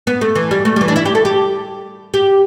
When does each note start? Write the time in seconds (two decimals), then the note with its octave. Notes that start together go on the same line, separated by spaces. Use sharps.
0.07 B3
0.21 A3
0.35 E3
0.51 G3
0.65 A3
0.76 G3
0.81 E3
0.88 D4
0.96 E4
1.05 G4
1.15 A4
1.25 G4
2.14 G4